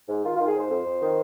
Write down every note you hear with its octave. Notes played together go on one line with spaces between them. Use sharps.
G#2
D#3 F4
F4
D#3
G#4
G#2 C5
F2
F2
D#3